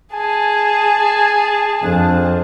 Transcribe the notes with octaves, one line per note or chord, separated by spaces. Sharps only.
G#4 G#5 A5
F2 D4